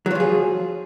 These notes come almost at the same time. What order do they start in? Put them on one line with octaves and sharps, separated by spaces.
F#3 F4 F3 G#4